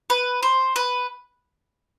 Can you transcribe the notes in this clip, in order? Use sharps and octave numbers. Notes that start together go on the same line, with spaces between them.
B4
C5
B4